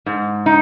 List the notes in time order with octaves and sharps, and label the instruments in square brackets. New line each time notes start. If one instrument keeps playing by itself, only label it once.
[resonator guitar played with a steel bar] G#2
D#4